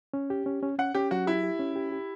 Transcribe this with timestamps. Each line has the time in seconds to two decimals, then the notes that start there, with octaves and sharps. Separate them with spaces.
0.14 C#4
0.30 G4
0.46 C#4
0.63 C#4
0.78 C#4 F#5
0.95 C#4 G4
1.11 F#3 F#4
1.27 E4 G4
1.43 G4
1.59 C#4
1.76 G4
1.92 G4